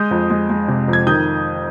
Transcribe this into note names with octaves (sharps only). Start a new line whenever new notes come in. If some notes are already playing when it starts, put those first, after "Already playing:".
Already playing: G#3 D#6 G6
F2
G#3
G#3
C3
F2
G#6
D#3 D#6 G6